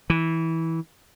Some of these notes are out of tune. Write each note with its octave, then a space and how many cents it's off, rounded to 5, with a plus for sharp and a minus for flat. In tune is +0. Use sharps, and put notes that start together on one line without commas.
E3 -15